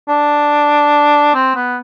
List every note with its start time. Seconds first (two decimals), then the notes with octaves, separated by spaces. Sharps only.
0.09 D4
1.35 C4
1.55 B3